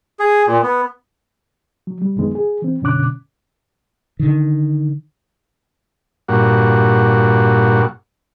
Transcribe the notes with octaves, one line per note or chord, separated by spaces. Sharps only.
G#4
A#2
B3
F#3
G3
C2 F#2 D#3 G#3 B3
G#4
E3 C4
F#2 B2 D3 C#4 D6 F#6
D3 D#3
G2 A#2 F#4